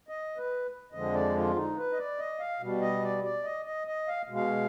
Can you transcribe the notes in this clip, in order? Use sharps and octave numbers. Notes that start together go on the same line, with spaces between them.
D#5
B4
F2 D3 F3 G#3 D#5
D5
F4
D#4
B4
D#5
D5
D#5
F5
B2 G3
D#5
D5
D5
D#5
D#5
D#5
F5
B2 G#3
F5